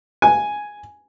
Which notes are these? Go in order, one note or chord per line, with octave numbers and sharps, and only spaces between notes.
G#5